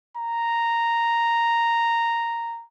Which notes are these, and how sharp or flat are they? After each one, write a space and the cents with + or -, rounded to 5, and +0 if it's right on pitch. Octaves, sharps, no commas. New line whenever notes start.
A#5 -5